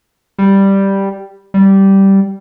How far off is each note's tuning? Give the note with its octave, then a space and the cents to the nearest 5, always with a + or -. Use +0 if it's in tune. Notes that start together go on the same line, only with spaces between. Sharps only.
G3 +0
G3 -10